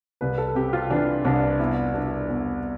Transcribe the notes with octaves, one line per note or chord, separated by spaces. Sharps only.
C2 B4
A4
C3 G4
F4
E3 D4
C2 D4
E2 E4
B2 D4
E2